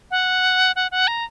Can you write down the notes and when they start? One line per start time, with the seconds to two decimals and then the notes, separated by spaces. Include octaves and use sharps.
0.11 F#5
0.76 F#5
0.91 F#5
1.07 A#5